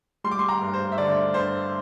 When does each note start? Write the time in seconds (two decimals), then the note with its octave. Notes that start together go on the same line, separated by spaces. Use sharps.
0.24 G3 C6
0.31 D6
0.39 C6
0.49 A#5
0.61 G2
0.74 C5
0.92 E5
0.98 D3 D5
1.34 G2 C5